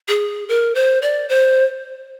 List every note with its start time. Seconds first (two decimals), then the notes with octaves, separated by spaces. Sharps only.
0.08 G#4
0.49 A#4
0.75 C5
1.02 D5
1.29 C5